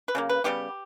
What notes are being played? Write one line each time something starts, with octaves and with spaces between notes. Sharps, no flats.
B4
C#3 F#3 A#3
B4
C#3 G3 B3 G4